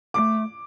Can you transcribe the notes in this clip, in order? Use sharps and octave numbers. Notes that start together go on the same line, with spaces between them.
A3 D6